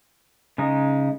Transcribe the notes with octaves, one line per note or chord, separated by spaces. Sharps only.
C#3 G#3 D#4